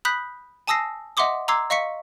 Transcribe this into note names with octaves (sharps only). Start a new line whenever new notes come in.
B5 D#6 F#6 G6 B6
G#5 A5 D#6 E6 A#6 C7
D#5 E5 F#5 C6 D6 D#6
A#5 C6 D6 E6 G#6 C7
D#5 F5 C#6 B6 C#7